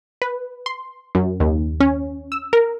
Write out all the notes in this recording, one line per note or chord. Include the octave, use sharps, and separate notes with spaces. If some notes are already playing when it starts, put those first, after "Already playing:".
B4
C6
F#2
D#2
C#4
E6
A#4